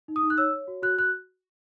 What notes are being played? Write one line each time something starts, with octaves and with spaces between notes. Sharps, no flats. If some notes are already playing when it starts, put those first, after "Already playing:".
D#4
D#6
D#4
F#6
C#5 E6
C#5
F#4
F#4 F#6
F#4 F#6